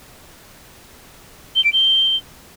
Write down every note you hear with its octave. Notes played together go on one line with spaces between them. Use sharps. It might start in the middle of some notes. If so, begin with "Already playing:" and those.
G7
D7
G7